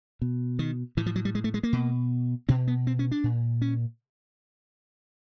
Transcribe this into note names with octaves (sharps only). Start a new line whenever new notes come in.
B2
D#3
A2 E3
F3
F#3
G3
G#3
A3
G#3
A#3
B2
B2 C4
B3
C4
C#4
D4
A#2
C#4